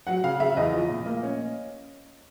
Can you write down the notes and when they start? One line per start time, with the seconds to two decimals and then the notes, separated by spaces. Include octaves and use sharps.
0.07 F#3 F#5
0.24 C#3 F5
0.40 C#3 E5
0.57 E2 D#5
0.73 F3
0.89 A#2
1.06 A#3
1.23 C#4